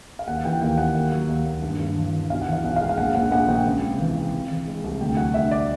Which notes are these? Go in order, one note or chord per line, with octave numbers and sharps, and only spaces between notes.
F5
D#2 F#5
E3 G5
D#2 G5
D#2 F#5
D#2
F#3
D#2
D#2
G2
G2
E3
E3
B1 F5
F#5
E3
F5
B1 F#5
F5
G#3
F5
A#1 F#5
A#1 F#5
A#1 F#5
A#1 G5
C#2
C3
E3
C3
C3
E3
G#3
C2
D2 G5
F#3 F#5
D2 E5
D5